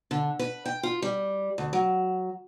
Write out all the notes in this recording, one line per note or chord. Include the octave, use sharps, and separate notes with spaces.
D3
B4
G5
F4
G3
D2
F#3